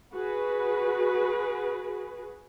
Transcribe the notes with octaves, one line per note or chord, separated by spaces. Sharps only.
F#4 G#4 B4